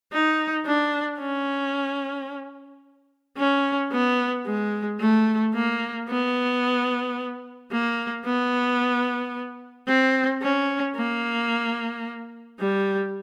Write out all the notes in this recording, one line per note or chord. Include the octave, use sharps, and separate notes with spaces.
D#4
D4
C#4
C#4
B3
G#3
A3
A#3
B3
A#3
B3
C4
C#4
A#3
G3